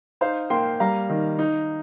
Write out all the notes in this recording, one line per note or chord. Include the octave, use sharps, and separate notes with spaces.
D#4 C5 F5
A#3 G5 C6
G3 F5 A#5
D#3
D#4